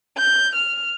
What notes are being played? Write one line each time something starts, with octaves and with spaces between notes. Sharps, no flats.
G6
F6